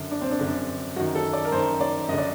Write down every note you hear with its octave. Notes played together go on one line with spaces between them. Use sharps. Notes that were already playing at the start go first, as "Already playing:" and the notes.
Already playing: F#2 D3
D4
C4
D4
F#2 D3
F#2 D#3 F#4
A4
D5
A#4
F#2 D#3 C5
D5
F#2 D3 D#5
D5